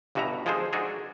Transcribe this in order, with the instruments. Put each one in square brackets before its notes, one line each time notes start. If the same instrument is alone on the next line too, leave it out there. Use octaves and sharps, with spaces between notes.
[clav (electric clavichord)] G1 G2 B2 F#4 E5 A#5
F3 G#3 D#4 G#4 A4 C5
G#3 D4 D#4 F#4 G#4 A4